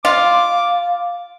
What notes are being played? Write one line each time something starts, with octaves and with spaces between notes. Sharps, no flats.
F4 D6